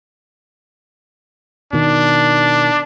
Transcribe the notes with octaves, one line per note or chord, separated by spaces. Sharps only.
B2 D#3 D4